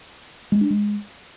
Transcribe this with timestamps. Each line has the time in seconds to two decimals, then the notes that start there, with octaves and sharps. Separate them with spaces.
0.52 G#3
0.61 D4
0.70 G#3